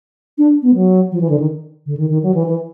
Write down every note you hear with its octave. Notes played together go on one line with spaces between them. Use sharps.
D4
B3
F#3
F3
E3
D3
D#3
D3
D#3
D#3
F#3
E3
E3